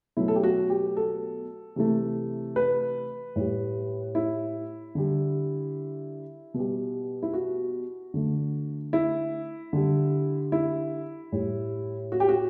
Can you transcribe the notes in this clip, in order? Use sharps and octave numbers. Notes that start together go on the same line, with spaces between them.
B2 F#3 A3 E4
A4
G4
F#4
G4
A4
C3 E3 A3
B4
A2 G3
E4
D3 G3
B2 G3
E4
F#4
D3 A3
E4
D3 G3
E4
A2 G3
F#4
G4
F#4